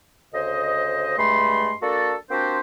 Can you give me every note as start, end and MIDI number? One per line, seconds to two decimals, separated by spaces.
0.34 1.14 38
0.34 1.14 49
0.34 1.14 72
0.34 1.14 75
1.18 1.74 43
1.18 1.74 56
1.18 1.74 57
1.18 1.74 83
1.18 1.74 84
1.82 2.15 58
1.82 2.15 62
1.82 2.15 66
1.82 2.15 69
2.30 2.60 58
2.30 2.60 60
2.30 2.60 62
2.30 2.60 66
2.30 2.60 67
2.30 2.60 72